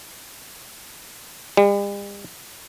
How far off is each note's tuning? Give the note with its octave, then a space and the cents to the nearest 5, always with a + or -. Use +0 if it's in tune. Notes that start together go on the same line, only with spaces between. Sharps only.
G3 +45